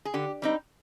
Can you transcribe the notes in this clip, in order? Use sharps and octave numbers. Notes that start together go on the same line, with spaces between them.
G#4
D3 G4
G3 C4 D#4